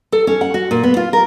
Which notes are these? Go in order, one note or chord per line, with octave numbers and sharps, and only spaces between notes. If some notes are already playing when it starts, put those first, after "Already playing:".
A4
C#4
F#5
F#4
A#2
B3
F4
A#4